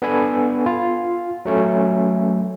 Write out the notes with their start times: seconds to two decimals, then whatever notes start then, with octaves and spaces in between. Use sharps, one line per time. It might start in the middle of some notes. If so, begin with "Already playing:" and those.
0.02 B3 D4 A4 G#5 B5
0.66 F4
1.45 F#3 A3 C#4